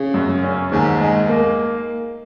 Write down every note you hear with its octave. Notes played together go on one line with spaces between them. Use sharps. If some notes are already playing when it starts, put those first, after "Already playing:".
Already playing: C#3
F#2
C#4
D#2 G#2
G#3
A#3